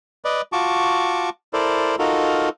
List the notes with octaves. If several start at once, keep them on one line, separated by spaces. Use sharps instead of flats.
B4 D5 D#5
F4 F#4 A5 C#6 D6
E4 A4 A#4 C5 D5
D#4 F4 F#4 A4 A#4